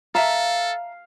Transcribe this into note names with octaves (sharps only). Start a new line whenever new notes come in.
A4 E5 F5 A5 A#5